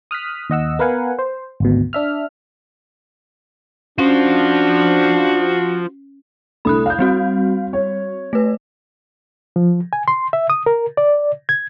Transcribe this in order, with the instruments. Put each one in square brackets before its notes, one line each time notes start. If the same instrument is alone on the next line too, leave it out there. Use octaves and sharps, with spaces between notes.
[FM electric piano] D#6 F6 F#6 B6
D#2 D#5 F#5 E6
B3 A#4 B4 F5 F#5 G#5
C5
G#1 D2 B2
D4 E5 F6
[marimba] C#4 [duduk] D4 [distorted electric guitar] F4 C5 [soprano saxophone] F#4
[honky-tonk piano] C2 D3 A3 [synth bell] B5 D#6 F#6
[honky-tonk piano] F5 G6
[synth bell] G3 C4 F#4
[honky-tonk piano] C#5
[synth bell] A3 B4
[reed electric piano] F3
G#5
C6
E5
D#6
A#4
D5
G#6